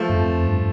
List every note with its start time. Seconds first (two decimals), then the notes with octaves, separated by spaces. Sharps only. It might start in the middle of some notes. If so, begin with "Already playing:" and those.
Already playing: F3 A3
0.09 G2
0.15 F2
0.47 G2